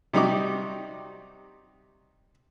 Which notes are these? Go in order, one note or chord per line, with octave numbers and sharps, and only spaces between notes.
C3 G3 D#4 F#4 D6